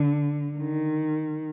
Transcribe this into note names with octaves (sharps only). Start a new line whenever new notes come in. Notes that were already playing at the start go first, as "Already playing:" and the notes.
Already playing: D3
D#3